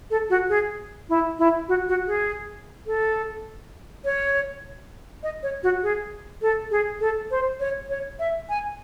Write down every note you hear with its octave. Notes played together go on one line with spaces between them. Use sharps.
A4
F#4
G#4
E4
E4
F#4
F#4
G#4
A4
C#5
D#5
C#5
F#4
G#4
A4
G#4
A4
C5
C#5
C#5
E5
G#5